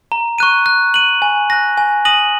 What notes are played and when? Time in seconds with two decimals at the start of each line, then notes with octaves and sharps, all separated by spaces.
0.12 A#5
0.38 C#6 F#6 D#7
0.66 F#6
0.94 D#7 F#7
1.22 G#5
1.50 F#6 A#6
1.78 G#5
2.05 D#6 A#6 D#7 F#7